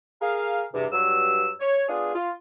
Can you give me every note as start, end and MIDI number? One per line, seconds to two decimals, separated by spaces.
0.22 0.64 68
0.22 0.64 70
0.22 0.64 77
0.74 0.87 40
0.74 0.87 43
0.74 0.87 48
0.92 1.51 43
0.92 1.51 54
0.92 1.51 88
1.61 1.85 73
1.89 2.11 59
1.89 2.11 62
1.89 2.11 65
1.89 2.11 68
2.15 2.31 65